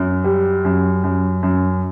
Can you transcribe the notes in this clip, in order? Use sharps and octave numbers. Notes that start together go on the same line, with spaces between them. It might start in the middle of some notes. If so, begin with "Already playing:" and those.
Already playing: F#2
G3
F#2
F#2
F#2